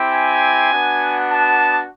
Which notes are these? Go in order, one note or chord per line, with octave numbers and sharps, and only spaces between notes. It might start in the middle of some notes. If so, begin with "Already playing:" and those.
Already playing: C4 E4 G4
G#5
B3 D4 F#4
A5